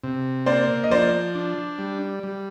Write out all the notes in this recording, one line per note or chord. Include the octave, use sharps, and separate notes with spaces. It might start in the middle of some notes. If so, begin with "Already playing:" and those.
C3
A#3 C5 D5
D#5
F3 C5 D5
D4
G3
G3